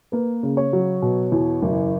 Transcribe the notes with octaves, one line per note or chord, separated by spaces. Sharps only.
A#3 B4
C#3
C#5
F#3
B2
E2
F#1